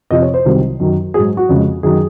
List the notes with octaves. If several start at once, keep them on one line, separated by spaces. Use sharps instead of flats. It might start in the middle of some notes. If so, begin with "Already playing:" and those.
F2 C3 F3 D#5
C#5
C5
C2 C3 D#3 F#3
F#2 D#3 F#3
G#2 F#3 G#4
F#4
F2 C#3 G#3
F#2 D#3 F#3 G#4